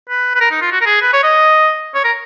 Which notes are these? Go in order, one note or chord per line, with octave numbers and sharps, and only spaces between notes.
B4
B4
A#4
D#4
F4
F#4
A#4
G#4
B4
C#5
D#5
C#5
A#4